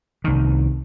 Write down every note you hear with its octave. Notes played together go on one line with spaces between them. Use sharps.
C2 D#3